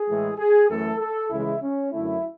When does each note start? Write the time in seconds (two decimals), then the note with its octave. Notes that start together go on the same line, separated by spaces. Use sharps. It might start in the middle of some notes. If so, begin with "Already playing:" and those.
Already playing: G#4
0.08 A2 E3 G#3
0.39 G#4
0.70 F#2 E3 A3 A4
1.00 A4
1.30 C#2 C#3 E3 G#3 E4
1.62 C#4
1.92 F#2 D3 A3 E4